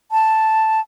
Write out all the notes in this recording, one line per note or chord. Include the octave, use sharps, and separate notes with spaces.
A5